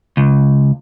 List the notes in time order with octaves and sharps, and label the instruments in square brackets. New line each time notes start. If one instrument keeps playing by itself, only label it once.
[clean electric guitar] C#2